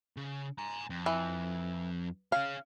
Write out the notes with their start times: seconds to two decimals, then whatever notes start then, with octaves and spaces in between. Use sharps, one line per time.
0.17 C#3
0.58 G#5 A#5
0.90 F2
1.06 E3
2.32 C#4 G#4 F5